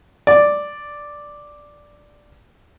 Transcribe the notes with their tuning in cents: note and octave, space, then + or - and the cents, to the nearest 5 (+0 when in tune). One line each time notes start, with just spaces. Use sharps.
D5 +0